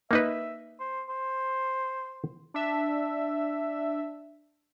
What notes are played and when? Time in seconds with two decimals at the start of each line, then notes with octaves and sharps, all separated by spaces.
0.11 A#3 D#4 B4 E5
0.79 C5
1.09 C5
2.54 D4 E5